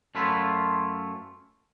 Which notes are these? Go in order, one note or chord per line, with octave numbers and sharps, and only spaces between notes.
F#2 A3 E4 F4 B4 B5